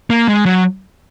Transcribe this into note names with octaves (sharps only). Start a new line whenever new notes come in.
A#3
G#3
F#3